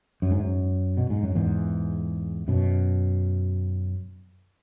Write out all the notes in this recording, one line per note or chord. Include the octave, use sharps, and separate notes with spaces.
F#2
G#2
F#2
B2
G#2
F#2
E2 G#2
F#2 B2